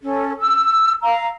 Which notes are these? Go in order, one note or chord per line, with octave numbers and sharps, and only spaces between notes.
C#4 A4
E6
F5 A#5